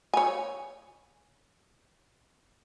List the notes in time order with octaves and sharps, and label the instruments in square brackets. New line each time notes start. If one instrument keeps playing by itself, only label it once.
[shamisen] C#5 G#5